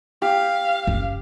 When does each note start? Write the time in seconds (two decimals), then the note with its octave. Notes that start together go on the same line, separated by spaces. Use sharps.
0.22 G4 F5
0.87 F#1